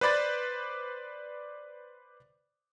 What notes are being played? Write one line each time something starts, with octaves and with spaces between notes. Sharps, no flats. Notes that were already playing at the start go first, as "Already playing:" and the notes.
B4 C5 D5 B5 A6